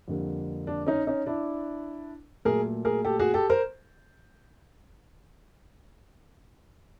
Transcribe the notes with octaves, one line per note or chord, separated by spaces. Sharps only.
F2 D3 G3 A#3
D4
C#4 D#4
C#4 D#4
D4 E4
A#2 F#3 A3 G#4 A#4
G#4 A#4
G4 A4
F#4 G#4
G4 A4
A#4 C5